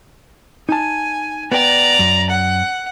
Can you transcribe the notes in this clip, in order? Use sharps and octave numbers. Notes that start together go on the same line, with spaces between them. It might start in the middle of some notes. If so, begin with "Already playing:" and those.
D#4 G#5 A5
B3 B4 D5 G5 A#5
F#2
F#5